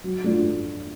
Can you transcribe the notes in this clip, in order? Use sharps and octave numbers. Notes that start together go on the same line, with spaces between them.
F#3
A3 D4 F4